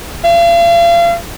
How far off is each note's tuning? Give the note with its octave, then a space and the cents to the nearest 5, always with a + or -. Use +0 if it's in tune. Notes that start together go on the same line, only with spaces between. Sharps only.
F5 -40